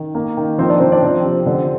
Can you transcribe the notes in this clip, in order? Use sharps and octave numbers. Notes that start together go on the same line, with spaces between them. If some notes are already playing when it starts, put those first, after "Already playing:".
Already playing: D#3
A#3
D#3
F3 C4 C5
D4 D5
F3 C4 C5
D4 D5
F3 C4 C5
C3
D3